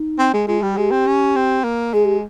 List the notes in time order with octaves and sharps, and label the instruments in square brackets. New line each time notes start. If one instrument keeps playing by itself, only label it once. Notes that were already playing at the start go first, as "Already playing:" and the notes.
Already playing: [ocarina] D#4
[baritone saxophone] C4
G#3
[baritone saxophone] G#3 [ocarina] F4
[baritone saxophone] G3 [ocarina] G4
[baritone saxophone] G#3 [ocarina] G4
[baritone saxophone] C4
C#4
C4
A#3
[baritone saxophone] G#3 [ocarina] G#4
[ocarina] G4